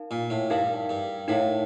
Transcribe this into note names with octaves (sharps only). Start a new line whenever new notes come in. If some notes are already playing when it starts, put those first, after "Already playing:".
Already playing: D#4 A#4 F5 A5
A#2
A2
G2 D#4 A#4 F5 A5
G2
A2 D#4 A#4 F5 A5